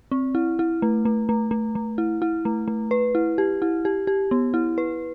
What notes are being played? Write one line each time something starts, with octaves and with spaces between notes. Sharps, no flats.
C4
E4
E4
A3
A3
A3
A3
A3
E4
E4
A3
A3
B4
E4
G4
E4
G4
G4
B3
E4
B4